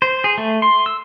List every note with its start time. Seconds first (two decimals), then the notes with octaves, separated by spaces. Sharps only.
0.02 C5
0.24 G#4
0.38 A3
0.62 C6
0.86 E6